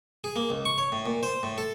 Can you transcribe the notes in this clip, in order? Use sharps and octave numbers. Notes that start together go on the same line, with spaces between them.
G#4
A#3
C#2
C#6
C#5
A2
A#2
C5
A2
A4